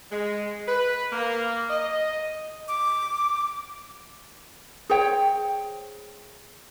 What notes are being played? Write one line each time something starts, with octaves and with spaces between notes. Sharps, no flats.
G#3
B4
A#3
D#5
D6
G#4 C5 C#5 G5